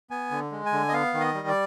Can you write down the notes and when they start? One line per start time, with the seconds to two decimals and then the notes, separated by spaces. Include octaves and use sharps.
0.10 B3 G#5
0.31 D3
0.52 G#3
0.66 G#5
0.73 D3
0.89 D#5
0.92 B3 F5
1.14 D#3
1.20 D#5
1.35 G3
1.48 D5